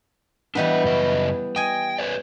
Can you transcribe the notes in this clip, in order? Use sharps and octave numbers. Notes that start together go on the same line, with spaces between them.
E3 G3 B3 D4 D#5
F#2 C#3 D#5
D#5 G5 G#5
B4 C#5 D5